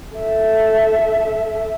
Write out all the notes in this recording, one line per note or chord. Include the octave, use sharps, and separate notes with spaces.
A4 E5